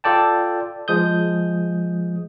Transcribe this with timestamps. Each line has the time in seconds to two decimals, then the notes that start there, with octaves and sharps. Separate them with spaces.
0.04 F4 A4 D5 G5 A5
0.88 F3 G#3 D#6 G6